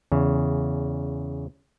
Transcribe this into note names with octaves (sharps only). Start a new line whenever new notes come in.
E2 C#3